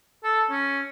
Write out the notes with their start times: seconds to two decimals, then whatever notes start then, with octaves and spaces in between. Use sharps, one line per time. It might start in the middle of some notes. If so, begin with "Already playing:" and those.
0.24 A4
0.50 C#4